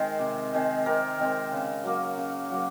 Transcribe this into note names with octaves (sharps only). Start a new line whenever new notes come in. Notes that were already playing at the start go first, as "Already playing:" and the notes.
Already playing: D#3 G#3 C4
C3
D#3 G#3 C4
C3 A#4
D#3 G#3 C4
C#3
F#3 A#3
C#3
F#3 A#3